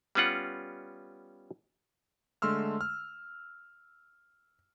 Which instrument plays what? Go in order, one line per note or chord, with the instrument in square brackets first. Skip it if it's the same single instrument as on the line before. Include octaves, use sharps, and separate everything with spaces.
[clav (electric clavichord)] G3 B3 C#4 F4 F#5
[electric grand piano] D3 G#3 A3 C6 E6 F6
F6